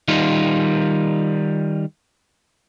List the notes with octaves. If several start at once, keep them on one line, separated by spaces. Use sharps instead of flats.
D#3 G3 D#4 F4